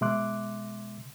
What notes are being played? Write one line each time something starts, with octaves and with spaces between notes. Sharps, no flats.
B2 G#3 E5 C6 D6 F#6